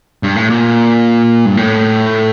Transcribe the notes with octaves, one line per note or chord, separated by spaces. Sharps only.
G2
A2
A#2
G2
A2